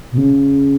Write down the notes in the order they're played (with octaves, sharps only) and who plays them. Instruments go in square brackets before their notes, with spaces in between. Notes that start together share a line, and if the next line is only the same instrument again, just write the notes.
[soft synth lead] B2
C#3